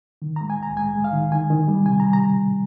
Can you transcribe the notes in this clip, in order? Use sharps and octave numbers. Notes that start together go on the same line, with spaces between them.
D#3
G#3 A#5
G#5
C2 A#5
G#3 G#5
G#3
F5
D#3
D#3 G#5
D#3
G3
C3 G#5
A#5
G3
A#5